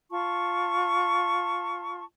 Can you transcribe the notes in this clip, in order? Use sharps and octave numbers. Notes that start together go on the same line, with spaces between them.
F4 A5 C#6